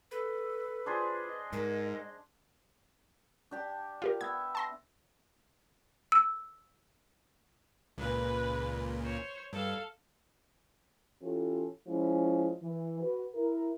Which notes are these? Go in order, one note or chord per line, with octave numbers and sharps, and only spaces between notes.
A4 B4
D4 F4 G#4 C5
D#5
G#2 A#4
D4 G4 A5
F4 G4 A#4 F5
B3 E5 G#6
A5 C6 A#6
E6
C#2 A#2 B4
C5 C#5
G2 A4 F5
E3 C#4 F4 G4 A4
F3 G#3 C#4 E4 F4
E3
F#4 B4
E4 A#4